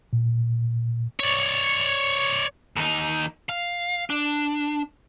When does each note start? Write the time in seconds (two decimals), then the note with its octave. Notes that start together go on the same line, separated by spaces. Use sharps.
0.13 A#2
1.20 C#5 D5
2.76 D#2 D#4
3.49 F5
4.10 D4